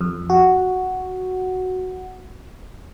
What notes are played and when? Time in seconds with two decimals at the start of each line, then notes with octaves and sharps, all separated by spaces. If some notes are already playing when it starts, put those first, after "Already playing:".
0.01 F2
0.30 F#4